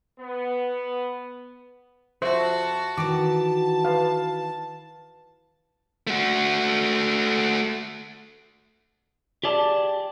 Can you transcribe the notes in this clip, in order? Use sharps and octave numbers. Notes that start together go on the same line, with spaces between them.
B3
F2 F#4 C5 E5 A5
D#3 E3 F#4 A5 D6
B4 F5
A3 F#4
G4 G#4 D5 A5